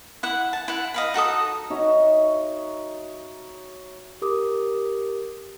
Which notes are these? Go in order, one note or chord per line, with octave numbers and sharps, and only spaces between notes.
E4 F#5
A5
E4 F#5
D#5 F5 B5
D#4 F#4 A4 D#6
D#4 F#4 C#5 E5
G4 A#4 D6 D#6